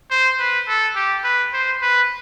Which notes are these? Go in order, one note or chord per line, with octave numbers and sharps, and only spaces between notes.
C5
B4
A4
G4
B4
C5
B4